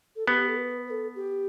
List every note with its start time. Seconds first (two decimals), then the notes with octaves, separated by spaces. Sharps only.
0.16 A4
0.27 B3 G4
0.48 A4
0.57 B4
0.87 B4
0.90 A4
1.16 G4